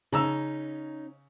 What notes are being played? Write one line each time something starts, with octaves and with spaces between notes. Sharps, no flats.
C#3 C#4 D#4 A#5 E6